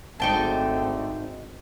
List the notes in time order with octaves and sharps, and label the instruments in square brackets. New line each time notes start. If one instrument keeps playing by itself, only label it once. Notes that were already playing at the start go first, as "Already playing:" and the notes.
[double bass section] G#1 C4 [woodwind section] D3 A3 [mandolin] D#4 G5 A5